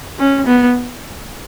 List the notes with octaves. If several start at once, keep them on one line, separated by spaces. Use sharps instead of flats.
C#4
B3